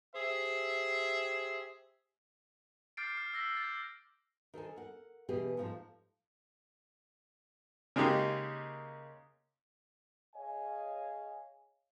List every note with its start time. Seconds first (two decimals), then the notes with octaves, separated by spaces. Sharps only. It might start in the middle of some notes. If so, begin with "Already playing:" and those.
0.15 G4 G#4 C5 E5
2.97 D6 F6 G6 A6 C7 D7
3.17 F6
3.34 E6 A#6 B6
3.57 G6 A6
4.54 D#3 A4 C5 G#5
4.76 A#4 F#5
5.29 B2 E3 B3 G4 G#4
5.57 G#2 F3 A3
7.96 C#3 G#3 A#3 D#4 G4
10.35 G#4 C#5 D#5 F5 G#5